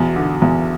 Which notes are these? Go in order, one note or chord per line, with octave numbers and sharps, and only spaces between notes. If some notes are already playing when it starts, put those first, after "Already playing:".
Already playing: E2 B2
D3
E2